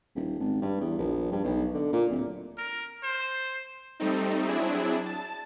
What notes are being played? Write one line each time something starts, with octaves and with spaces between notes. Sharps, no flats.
D#1
G#1
G2
E2
A#1
G2
B1
D3
A#2
D1
A#4
C5
G3 A3 C4 D#4
F#3 C4 D4 E4 G#4
A5